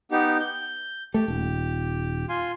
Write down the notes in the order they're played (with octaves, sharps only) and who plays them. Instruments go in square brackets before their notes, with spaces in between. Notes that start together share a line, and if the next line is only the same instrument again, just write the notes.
[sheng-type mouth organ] B3 D#4 G4
G6
[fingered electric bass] A3 [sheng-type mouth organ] G4
[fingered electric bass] D#1
[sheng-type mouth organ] F4 G#5 C6